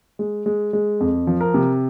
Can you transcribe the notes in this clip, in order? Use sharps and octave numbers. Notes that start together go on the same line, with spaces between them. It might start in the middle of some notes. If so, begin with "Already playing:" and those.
G#3
G#3
G#3
F2
F3
A#4
C3